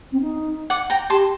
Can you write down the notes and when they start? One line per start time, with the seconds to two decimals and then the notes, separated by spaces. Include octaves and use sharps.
0.11 C4
0.21 D#4
0.70 D5 F#5
0.90 G5 A#5
1.10 G4 A5 C6